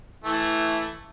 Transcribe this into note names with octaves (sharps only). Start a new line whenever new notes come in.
E3 A3